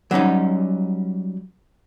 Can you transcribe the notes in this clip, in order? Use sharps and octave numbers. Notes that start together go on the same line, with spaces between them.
F#3 G3 C#4 D#4